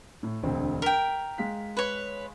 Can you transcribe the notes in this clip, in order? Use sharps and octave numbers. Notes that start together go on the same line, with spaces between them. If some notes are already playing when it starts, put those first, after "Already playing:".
A2
E1 D2 C4
A#4 G5 B6
G#3 F5 B6
B4 C#5